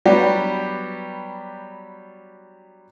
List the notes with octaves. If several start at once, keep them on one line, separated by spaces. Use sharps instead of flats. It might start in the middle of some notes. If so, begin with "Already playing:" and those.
F#3 G3 B3 D4 G4